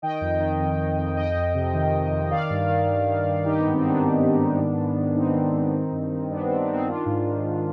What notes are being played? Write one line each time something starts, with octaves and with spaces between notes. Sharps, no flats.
D#3 D#5 G5
F2
D#3
F2
D#3
F2
F2 D#5 G5
F2
C3
D#3
F2
F2
D#3 D5 F5
G2
D#3
G2
D#3
G2
D#3 D#4 G4
B3
G#2
C4
D#3
B3 D4
G#2
D#3
G#2
D#3
G#2
D#3
G#2 C4 D#4
D#3
G#2
D#3
G2
D#3
G2 B3 D4
D#3 C4
B3 D4
G2 C4 D#4
D#3 D4 F4
G#2
D#3
G#2